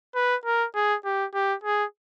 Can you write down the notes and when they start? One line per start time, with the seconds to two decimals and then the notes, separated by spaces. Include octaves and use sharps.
0.15 B4
0.45 A#4
0.75 G#4
1.05 G4
1.34 G4
1.64 G#4